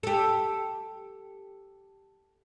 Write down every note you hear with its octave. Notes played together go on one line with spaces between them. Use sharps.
G4 A4